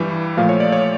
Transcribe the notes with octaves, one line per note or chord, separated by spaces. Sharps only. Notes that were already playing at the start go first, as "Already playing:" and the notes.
Already playing: G2 E3 G3
A#2 F3 A3 F5
C#5
D5
C#5